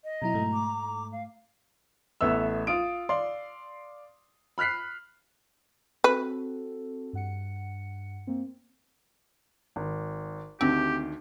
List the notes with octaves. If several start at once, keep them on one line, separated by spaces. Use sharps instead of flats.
D#5
B2 F#3 E4 A#5
G#2 A3
D6
F5
A1 A3 B3 E5 E6
F4 D#6 D7
D5 F5 C6
B5 F6 F#6 B6 C7
C4 F#4 A4 B4
G2 F#5 C#7
A#3 C4
G#1
D2 D3 D#3 C4 G4